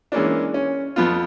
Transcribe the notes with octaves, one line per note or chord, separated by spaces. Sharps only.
E3 G#3 A#3 C#4 D4
C#4
F2 B3 F4